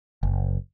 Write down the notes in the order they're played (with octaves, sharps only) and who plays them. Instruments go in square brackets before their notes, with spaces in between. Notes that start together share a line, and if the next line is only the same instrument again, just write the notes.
[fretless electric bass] F#1